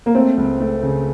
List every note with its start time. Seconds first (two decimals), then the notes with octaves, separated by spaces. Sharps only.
0.06 A#3
0.15 A3 C4
0.37 C#2
0.60 A3
0.83 C#3